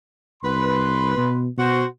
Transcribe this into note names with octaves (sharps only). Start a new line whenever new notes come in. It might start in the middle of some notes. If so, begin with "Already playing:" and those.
C2 B4 C6
B2
B2 F#4 C5